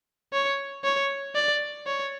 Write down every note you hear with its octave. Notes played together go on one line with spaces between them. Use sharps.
C#5
C#5
D5
C#5